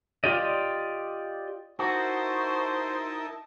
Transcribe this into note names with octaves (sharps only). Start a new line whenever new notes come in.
F4 G4 D5 D#5
D#4 E4 F#4 A#4 C5 A5